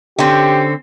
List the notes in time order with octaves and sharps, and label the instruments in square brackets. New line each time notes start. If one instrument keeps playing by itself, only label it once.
[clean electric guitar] D3 [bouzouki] C4 C#4 [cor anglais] G4